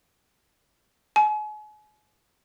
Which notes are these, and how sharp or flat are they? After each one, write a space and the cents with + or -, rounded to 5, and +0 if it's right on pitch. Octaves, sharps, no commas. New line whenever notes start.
G#5 +40